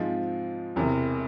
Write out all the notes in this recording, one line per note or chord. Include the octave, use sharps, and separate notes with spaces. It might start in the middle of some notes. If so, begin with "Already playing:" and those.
Already playing: G#2 F3 G#3 C4 F4
E1 E2 C3